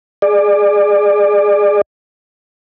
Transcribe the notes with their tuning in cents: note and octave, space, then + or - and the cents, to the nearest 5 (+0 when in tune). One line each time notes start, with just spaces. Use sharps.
G#4 +0 D5 +30